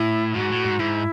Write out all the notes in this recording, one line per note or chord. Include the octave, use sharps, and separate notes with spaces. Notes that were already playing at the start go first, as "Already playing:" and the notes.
Already playing: A2 E4
G#2 F#4
A2
G#2
G#2 E4